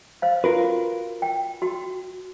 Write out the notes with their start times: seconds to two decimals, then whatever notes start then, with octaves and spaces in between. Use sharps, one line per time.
0.22 C5 F5
0.44 F4 F#4 A#4 B4
1.22 G5
1.62 F#4